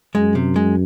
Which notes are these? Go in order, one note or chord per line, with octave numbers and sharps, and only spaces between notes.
F#2 G#3
C3
G#3